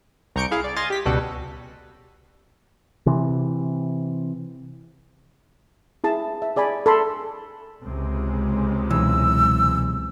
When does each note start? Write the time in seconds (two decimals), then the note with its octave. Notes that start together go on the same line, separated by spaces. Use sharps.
0.36 C2 A#5 C#6 G6 C#7 D7
0.51 E4 G#4 F5
0.64 D5
0.76 D#5 G#5 C6 D#6 F6 A6
0.90 G4 B6
1.06 C#2 B2 G3 F#4 A4 F#5
3.06 C3 E3
6.04 E4 G#4 A5
6.42 E5
6.56 G#4 D5 G#5 B5
6.86 A4 B5 C6
7.83 C#2 C3 G#3
8.90 B1 E3 E6